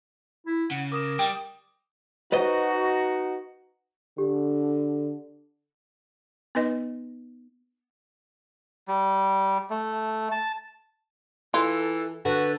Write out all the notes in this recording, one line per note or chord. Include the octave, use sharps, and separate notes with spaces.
E4
C#3 F#5
A#4 D6 D#6 E7
G3 G5 D6 D7
D#4 F#4 B4 C5 D#5
D3 G4
B3 D#4 B4 D#5
G3
A3
A5
E3 F4 A4
D3 F#4 B4